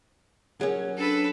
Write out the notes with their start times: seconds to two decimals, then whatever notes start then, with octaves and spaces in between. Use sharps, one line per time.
0.61 F#3 C#4 G#4 A#4
0.97 D4 A4 B4